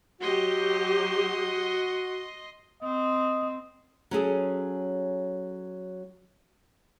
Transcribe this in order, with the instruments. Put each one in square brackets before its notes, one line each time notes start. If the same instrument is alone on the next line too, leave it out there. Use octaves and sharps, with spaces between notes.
[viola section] F#3 G4 [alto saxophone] F#4 [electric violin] D#5 C6
[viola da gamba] C4 [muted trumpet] D#5
[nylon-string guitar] F#3 C#4 G#4 A4